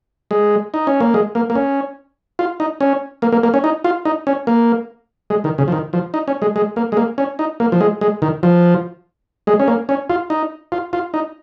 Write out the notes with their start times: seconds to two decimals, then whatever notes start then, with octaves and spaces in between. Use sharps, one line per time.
0.31 G#3
0.74 D#4
0.87 C#4
1.01 A#3
1.14 G#3
1.35 A#3
1.50 A#3
1.55 C#4
2.39 F4
2.60 D#4
2.81 C#4
3.22 A#3
3.32 A#3
3.43 A#3
3.54 C#4
3.64 D#4
3.84 F4
4.05 D#4
4.27 C#4
4.47 A#3
5.30 G#3
5.44 D#3
5.58 C#3
5.68 F3
5.72 D#3
5.93 F3
6.14 D#4
6.28 C#4
6.42 G#3
6.56 G#3
6.76 A#3
6.92 G#3
6.97 A#3
7.18 C#4
7.39 D#4
7.60 A#3
7.72 F3
7.81 G#3
8.01 G#3
8.22 D#3
8.43 F3
9.47 G#3
9.59 C#4
9.68 A#3
9.89 C#4
10.10 F4
10.30 D#4
10.72 F4
10.93 F4
11.14 D#4